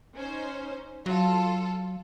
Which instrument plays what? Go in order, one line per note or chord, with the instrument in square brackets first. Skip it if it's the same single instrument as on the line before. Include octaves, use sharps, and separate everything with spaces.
[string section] C#4 D#4 C5
[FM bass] F#3 [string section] F4 A4